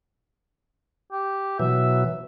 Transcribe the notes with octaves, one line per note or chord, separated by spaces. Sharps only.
G4
B2 E3 F#3 E5